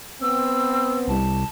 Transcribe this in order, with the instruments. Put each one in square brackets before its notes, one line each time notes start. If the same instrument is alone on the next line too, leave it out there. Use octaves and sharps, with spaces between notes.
[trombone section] B3 C4 [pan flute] E6
[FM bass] C2 [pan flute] A5